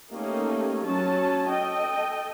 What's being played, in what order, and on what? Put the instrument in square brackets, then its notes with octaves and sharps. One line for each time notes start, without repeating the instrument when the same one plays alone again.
[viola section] A3 A#3 C#4 D#4 G4
F#3 C#4 A5
A4 D#5 G5